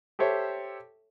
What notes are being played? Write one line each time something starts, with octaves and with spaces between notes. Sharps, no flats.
G4 A4 C5 C#5 E5